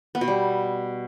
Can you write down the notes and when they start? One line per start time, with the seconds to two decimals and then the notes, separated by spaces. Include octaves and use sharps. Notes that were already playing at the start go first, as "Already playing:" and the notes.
0.15 B3
0.21 B2
0.28 G3